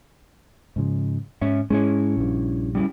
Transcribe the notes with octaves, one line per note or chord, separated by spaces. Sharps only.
G#2 C#3 F3
G#2 C#4 C#5 E5
G#2 G#3 C#4 E4 C#5
A#1 G2
G3 C#4 E4